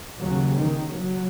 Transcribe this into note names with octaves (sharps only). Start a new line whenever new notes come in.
D#2 C#3 F#3
D#3
F#3